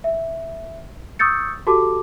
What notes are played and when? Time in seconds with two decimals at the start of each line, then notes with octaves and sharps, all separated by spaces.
0.04 E5
1.19 C#6 D#6 E6 G6 A6 C#7
1.67 F#4 G4 A4 A5 D6